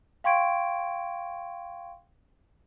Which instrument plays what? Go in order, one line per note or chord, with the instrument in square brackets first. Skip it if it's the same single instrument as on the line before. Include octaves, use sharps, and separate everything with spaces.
[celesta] F5 G5 C6 C#6 G#6 D7